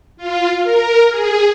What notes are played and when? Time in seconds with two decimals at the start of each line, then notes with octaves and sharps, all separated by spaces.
0.17 F4
0.63 A#4
1.09 G#4